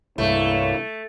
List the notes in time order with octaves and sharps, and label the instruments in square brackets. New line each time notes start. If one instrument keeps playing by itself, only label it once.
[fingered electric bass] C2 G2 [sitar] A3 [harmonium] A#3 C#5 [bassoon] E4